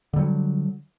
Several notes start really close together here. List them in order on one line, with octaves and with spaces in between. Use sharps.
D3 G3 F#3